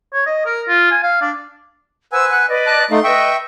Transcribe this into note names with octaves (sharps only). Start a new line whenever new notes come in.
C#5
D#5
A#4
F4
G#5
F5
D4
B4 C5 F#5 G#5 E6
F#5 F#6
B4 D5 D#5
A5 F#6
A3 D#4 F5 C6
B4 D#5 E5 G5 C#6